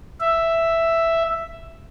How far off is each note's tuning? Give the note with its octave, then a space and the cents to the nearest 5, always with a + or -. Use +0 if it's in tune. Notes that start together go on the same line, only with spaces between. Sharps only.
E5 +5